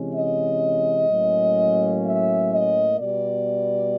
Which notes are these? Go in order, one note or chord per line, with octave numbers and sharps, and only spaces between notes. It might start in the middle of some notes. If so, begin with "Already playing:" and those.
Already playing: C3 E3 G#3 C#4
D#5
A2 F#3 A#3 C#4
E5
D#5
B2 G3 B3 D5